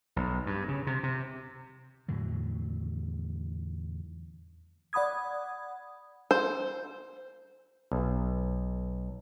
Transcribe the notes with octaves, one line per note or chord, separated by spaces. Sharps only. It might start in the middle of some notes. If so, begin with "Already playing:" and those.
B1
G2
C#3
C3
C3
E2 A2 D3 F#3
D5 F#5 B5 D#6 G#6
C5
B1